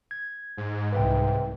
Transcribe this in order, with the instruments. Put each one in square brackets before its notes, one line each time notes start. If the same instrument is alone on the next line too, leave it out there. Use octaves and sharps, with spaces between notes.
[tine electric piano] G#6
[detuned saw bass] G#2
[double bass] C2 [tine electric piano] B4 E5 G5